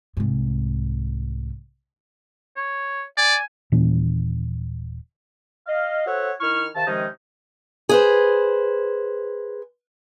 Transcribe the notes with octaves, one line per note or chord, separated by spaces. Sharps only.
C2 G#2
C#5
D5 G#5
D#1 A#2 E3 C#4
D#5 F5
F#4 A4 C5 C#5 E5 F#5
D#3 E4 C#6 F6
C3 D#3 F5 A5
C3 D#3 F3 G#3 C#4 D#4
G#4 B4 C5